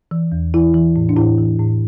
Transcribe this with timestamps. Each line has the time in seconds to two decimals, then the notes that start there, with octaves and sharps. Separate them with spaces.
0.11 E3
0.32 E2
0.54 E3 E4
0.74 E3
0.96 A2
1.09 D4
1.16 A2 E4
1.38 E3
1.59 A2